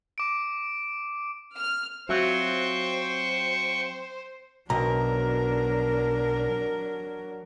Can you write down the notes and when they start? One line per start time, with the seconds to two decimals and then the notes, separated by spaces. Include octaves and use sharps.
0.18 D6 D7
1.57 F6
2.09 F#3 C4 F4 F#4 C5 E5 G5 C#6
4.70 B1 F#3 D4 A#4 A#5